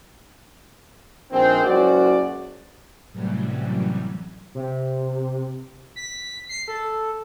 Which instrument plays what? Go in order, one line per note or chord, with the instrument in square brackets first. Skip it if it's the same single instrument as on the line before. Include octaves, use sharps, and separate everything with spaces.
[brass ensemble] A#1 D#3 G#3 C4
F#1 C#2 C#4 F#4 C5 D5
[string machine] F#2 A2 C3 E3 F#3 G3
[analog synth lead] C3
B6
C7
A4